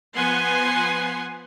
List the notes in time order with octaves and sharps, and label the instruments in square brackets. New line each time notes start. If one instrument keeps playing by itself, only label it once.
[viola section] F3 B3 B4 F#5 G#5 C6